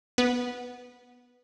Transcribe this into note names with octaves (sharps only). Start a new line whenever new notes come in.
B3